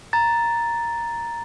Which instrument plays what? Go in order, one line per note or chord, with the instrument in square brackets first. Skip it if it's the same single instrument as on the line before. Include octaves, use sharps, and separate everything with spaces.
[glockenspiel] A#5 A6